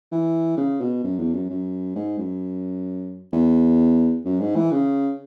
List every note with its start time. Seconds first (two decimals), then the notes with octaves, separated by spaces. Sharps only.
0.12 E3
0.57 C#3
0.81 B2
1.04 F#2
1.19 E2
1.34 F#2
1.50 F#2
1.95 G#2
2.18 F#2
3.33 E2
4.25 F#2
4.41 G#2
4.56 E3
4.72 C#3